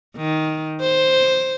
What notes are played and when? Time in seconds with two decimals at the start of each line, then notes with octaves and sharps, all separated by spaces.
0.17 D#3
0.81 C5